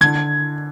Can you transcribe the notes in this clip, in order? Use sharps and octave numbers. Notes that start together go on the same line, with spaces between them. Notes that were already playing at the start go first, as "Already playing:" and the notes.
D3 G#6